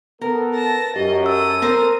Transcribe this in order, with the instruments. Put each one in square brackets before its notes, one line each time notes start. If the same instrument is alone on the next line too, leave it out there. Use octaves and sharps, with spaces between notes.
[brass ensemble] B3 A4 [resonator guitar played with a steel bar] A#4
[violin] A5 A#6
[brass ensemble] F#2 [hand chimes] G4 [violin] D#5
[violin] A4 D#6 [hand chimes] E6
[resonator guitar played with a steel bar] C4 A#4 C5